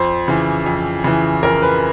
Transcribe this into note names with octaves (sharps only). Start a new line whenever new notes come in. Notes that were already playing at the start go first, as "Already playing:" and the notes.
Already playing: F2 C5
C#3 E3
F2
C#3 E3
F2 A#4
B4